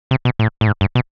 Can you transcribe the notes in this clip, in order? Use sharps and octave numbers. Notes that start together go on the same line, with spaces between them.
C3
B2
A2
A2
G#2
G2
B2